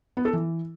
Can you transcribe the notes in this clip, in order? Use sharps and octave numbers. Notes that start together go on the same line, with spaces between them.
B3
A4
E3